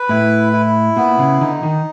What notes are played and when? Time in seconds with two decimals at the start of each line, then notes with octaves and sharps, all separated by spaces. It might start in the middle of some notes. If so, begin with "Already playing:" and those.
Already playing: B4
0.09 A2 E4
0.53 E4
0.97 A#2 B3
1.19 C#3
1.41 D3 D#4
1.63 D#3